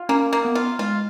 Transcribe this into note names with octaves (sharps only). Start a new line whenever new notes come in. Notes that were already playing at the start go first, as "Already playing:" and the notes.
Already playing: F4
A#3 C#4
A#3
B3
F4
G#3 F4